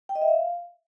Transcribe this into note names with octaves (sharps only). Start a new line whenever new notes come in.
G5
D#5
E5
F5